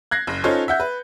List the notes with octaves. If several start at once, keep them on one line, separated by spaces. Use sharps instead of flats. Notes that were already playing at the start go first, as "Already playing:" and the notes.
F#6 G#6 A#6 C7
F#1
C#4 D#4 F4 A4 C5 C#5
E5 F#5 G6
B4